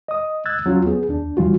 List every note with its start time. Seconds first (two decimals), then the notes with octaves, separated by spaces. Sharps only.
0.08 D#5 D#6
0.46 E6 F#6 G#6 A6
0.65 D#2 F#3 C#4 F4 F#4
0.86 B3 G#4
1.09 D#2 D4
1.37 E3 G3 F4 F#4